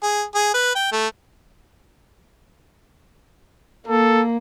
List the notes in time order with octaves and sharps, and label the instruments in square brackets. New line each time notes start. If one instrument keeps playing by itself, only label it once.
[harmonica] G#4
G#4
B4
G5
A3
[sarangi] A#3 [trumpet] A4